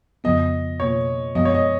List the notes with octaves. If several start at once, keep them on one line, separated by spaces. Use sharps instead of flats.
F2 C#3 F3 B3 D#5
B2 A#3 F4 C#5
F#2 F3 G#3 B3 D#5
C#5
D#5